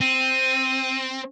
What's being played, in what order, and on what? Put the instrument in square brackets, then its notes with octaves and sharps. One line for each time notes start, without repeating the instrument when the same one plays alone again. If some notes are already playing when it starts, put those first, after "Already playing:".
[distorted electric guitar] C4 [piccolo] D#7